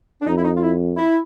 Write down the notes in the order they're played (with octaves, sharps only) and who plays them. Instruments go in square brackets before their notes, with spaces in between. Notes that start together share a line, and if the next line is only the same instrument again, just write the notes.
[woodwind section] D4
[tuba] F2 [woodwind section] D#4
[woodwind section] E4
D#4
F4
E4
E4